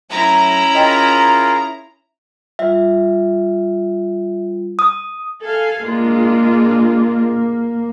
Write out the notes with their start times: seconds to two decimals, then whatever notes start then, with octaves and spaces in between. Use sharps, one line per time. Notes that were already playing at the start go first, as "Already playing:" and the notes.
0.11 F#3 A3 C#4 E4 A#5
0.75 F4 G#4 A#4 D#5 G5
2.59 G3 F4 E5
4.79 D#6
5.41 A4 F5 G#5
5.83 G#3 A#3 D4 F4